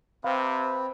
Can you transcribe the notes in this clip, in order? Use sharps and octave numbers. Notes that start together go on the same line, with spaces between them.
C3 C4 B4 F5